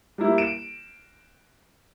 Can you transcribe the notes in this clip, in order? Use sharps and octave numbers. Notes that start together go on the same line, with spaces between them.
G3 A#3 E4
D7 E7